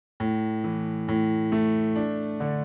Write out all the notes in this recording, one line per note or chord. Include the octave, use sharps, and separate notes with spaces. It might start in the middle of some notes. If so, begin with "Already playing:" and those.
A2
E3
A2
A3
D4
D3